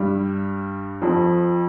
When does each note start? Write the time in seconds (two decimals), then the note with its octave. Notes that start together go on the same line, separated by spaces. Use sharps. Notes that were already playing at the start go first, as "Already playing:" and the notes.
Already playing: G2 G3
1.02 F2 F3